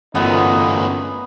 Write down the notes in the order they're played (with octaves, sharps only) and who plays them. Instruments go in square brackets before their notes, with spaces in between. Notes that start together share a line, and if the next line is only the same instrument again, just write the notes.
[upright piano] G1 [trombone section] A#2 F#3 D#4 [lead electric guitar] A3 C#4 [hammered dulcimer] B3